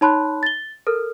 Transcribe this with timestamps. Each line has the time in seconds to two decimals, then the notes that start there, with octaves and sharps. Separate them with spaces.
0.01 D#4 C#5 A5 B5 C6 F#6
0.43 A6 G7
0.87 A4 A#4 F6